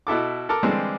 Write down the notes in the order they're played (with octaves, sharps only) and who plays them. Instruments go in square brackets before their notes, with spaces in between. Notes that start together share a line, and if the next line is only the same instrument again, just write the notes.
[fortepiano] B2 E4 A4 D6
A4 A#4 A5 D6
D3 E3 G3 G#3 C4